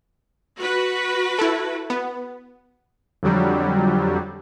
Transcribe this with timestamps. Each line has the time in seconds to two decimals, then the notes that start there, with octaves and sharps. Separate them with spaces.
0.58 F#4 B4
1.39 E4 A4
1.90 B3
3.23 F2 D3 F#3 G3